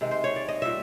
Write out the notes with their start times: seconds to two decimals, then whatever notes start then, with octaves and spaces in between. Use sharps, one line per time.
0.01 C3 D#3 G#3
0.11 C5
0.24 C#5
0.36 D5
0.48 D#5
0.62 A#2 G3 E5